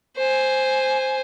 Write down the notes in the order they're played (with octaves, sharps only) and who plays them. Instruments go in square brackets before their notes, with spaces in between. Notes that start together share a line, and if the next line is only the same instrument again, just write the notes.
[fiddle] C5 G#5